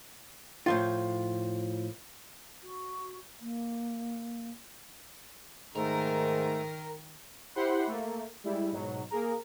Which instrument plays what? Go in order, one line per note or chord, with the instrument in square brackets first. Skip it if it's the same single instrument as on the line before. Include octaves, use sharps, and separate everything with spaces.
[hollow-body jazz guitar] A2 F3 F4
[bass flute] F#4
A#3
[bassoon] G#2 [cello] D#3 [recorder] A3 [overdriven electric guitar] A#4
[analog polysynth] E4 G4 C5 F#5 B5 C6
A3 A#3
G3 G#3 E4
G#2 B2 F#3
A#3 G#4 A#4